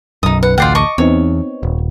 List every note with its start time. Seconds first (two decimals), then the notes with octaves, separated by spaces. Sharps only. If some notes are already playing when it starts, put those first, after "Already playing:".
0.23 B1 F#2 D#4 D#6
0.43 B4 F#5
0.58 A1 D2 F4 D5 F#5 G5 G6 C7
0.75 D#5 A5 C#6 D6
0.98 E2 B3 C4 D#4 C#5
1.63 D#1